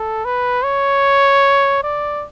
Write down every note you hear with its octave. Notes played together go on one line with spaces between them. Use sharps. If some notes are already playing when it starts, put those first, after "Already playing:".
Already playing: A4
B4
C#5
D5